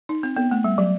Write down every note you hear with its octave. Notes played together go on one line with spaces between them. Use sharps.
D#4
C4
B3
A3
G3
F#3